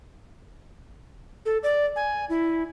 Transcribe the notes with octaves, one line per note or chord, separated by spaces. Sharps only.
A4
D5
G#5
E4